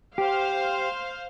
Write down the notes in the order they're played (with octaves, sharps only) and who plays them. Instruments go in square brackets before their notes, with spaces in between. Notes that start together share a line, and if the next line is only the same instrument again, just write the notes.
[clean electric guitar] G4 [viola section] C5 F5